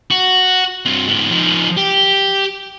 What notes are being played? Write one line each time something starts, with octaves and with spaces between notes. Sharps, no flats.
F#4
G2 C4
G#2 B3
F3 D#4
G4